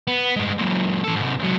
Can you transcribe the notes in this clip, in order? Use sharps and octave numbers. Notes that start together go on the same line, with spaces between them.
B3
G2 G#3
F#2 A#2
E3 A4
G#2 C3
C#2 F#3